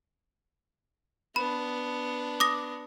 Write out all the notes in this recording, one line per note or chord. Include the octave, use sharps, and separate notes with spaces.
B3 D4 B5
D6 D#6 A#6